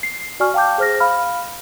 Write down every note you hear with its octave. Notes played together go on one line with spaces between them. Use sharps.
C7
F#4 D5 G#5 C#6 F6
F5 G5 A5 D6 G6
G#4 C5 F6 A#6
F5 B5 F6